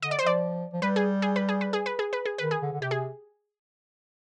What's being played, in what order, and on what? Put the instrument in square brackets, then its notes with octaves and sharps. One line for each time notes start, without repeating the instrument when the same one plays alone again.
[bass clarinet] D3 [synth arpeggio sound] D#5
[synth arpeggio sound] D5
C5
[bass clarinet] F3 [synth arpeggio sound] D5
[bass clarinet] F3
[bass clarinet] G3 [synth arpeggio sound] B4
[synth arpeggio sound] G#4
G#4
B4
G#4
B4
G#4
B4
G#4
B4
G#4
[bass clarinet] D#3 [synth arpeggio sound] B4
[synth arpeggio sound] G#4
[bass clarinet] D3
D3
[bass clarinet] C3 [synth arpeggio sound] G4
[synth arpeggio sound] G#4